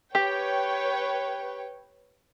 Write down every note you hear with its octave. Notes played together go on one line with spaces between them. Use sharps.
G4 B4 C#5 G5